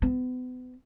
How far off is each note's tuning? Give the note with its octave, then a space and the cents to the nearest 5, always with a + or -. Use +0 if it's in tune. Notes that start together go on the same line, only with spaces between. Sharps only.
B3 +35